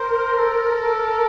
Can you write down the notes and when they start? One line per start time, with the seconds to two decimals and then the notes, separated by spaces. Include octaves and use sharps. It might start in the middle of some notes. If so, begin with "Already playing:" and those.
Already playing: A#4 C5
0.38 A4